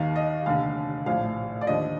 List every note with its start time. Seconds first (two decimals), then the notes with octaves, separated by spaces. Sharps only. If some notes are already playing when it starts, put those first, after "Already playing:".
Already playing: D#2 D#3 F5
0.16 D#5
0.46 F1 D#2 D3 F5
1.06 A#1 A2 F3 F5
1.61 D5
1.67 D#2 D3 F3 D#5